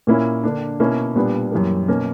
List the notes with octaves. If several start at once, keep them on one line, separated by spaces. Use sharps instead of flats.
A#2 A#3 C#4 E4
D3 A#3 D4
B2 A#3 C#4 E4
A#2 G3 B3 D4
F#2 E3 G3 A#3
B2 A#3 C#4